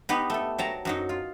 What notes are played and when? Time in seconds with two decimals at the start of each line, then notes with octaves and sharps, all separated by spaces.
0.09 B3 D#4 G4 B4
0.30 A3 A4
0.58 F#3 G5 A5 A#5
0.85 F#2 F#3 D#4
1.09 F4